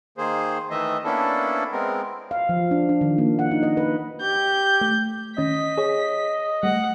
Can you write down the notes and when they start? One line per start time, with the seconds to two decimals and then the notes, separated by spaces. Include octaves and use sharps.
0.18 D#3 A#3 G#4 C5
0.71 D#3 E3 A3 D#5 E5
1.05 A#3 B3 C#4 D4 E4 A4
1.72 G#3 B3 C4 A#4
2.31 F5
2.49 F3
2.71 D4
2.89 D4
3.01 D#3
3.18 A#3
3.39 F#5
3.51 D#4
3.63 D#5
3.77 B4
4.21 G4 G6
4.81 A3
5.38 D#3 C#4 D#5 B6
5.78 G#4 C#5
6.63 G3 A3 F#5